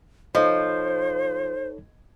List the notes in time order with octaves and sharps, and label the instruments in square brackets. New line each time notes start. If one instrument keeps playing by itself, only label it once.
[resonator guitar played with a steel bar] F3 [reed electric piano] D#4 A4 C#5 [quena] C5 [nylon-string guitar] D#5